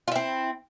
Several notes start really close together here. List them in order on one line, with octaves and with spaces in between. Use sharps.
F4 E4 C4